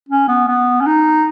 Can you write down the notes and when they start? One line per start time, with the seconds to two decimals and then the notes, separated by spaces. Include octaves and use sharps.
0.09 C#4
0.28 B3
0.48 B3
0.81 C#4
0.87 D#4